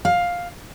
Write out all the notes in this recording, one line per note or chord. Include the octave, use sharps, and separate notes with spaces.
F5